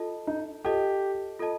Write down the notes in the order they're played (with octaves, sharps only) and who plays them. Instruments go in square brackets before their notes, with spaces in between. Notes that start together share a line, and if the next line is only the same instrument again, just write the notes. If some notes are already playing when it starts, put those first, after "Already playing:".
Already playing: [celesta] F4 A4 D#5 A5
[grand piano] D#4
[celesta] F4 A4 D#5 A5 [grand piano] G4
[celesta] F4 A4 D#5 A5